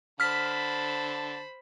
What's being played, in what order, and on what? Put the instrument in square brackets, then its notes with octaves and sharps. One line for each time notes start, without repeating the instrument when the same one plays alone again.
[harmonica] D3 A5 [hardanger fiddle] C5 B5 [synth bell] F6 B6